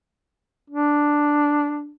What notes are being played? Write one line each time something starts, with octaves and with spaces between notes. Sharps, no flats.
D4